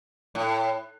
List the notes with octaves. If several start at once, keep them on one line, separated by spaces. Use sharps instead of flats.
A2